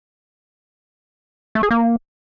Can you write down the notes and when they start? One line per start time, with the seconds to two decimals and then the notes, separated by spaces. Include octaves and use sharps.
1.55 A3
1.63 G#4
1.71 A#3